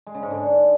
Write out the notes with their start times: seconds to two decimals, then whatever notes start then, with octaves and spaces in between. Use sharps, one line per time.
0.07 G#3
0.15 C#3
0.23 G#2
0.31 D3